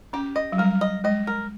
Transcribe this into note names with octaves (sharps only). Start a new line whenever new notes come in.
C#4 G4
D#5
F#3
G3 A#4
D#5
G#3 D#5
A#4